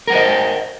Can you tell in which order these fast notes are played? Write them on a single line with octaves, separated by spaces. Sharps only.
A#4 F#5 C5 D#5